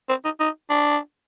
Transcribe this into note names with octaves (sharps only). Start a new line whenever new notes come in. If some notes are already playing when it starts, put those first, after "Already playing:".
C4
D#4
D#4
D4